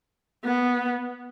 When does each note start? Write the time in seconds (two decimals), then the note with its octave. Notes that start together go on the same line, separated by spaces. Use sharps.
0.44 B3